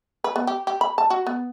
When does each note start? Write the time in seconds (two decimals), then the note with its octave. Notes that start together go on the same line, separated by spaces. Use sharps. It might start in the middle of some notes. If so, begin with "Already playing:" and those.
0.24 B4
0.36 B3
0.47 G4
0.67 G4
0.81 B5
0.98 A5
1.10 F#4
1.27 B3